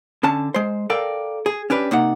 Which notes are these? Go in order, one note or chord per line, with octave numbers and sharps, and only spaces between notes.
D3 C#4 A5
G#3 C5
A4 A#4 D5 F5 G5
G#4
C#4 D4 G4 B4
C3 A#3 D#4 F#5